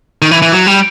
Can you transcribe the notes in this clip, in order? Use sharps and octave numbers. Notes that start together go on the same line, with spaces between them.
D#3
E3
E3
F#3
G3